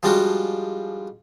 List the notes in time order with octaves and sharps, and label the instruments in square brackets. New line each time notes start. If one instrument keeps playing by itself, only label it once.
[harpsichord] F3 G3 G#3 D4 F4 F#4